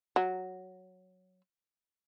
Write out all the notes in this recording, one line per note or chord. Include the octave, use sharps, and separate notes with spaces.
F#3